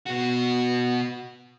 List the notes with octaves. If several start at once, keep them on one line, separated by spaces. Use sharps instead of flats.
B2 F#4